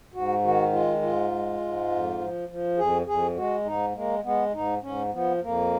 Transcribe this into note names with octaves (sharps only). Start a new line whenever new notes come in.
G#2 F#4
D#3 F#4
G#3 F4
G#2 F4
G#3
G#2
F2
F3
F3
F2 G#4
F2 G#4
G#3 F#4
G#2 D#4
G#3 A#3
G#3 B3
G#2 D#4
G#2 C#4
F3 B3
F2 A#3